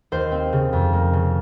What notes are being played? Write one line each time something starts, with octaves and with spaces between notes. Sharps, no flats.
D#2 C5
C4
C#3
F2
A#3
C#3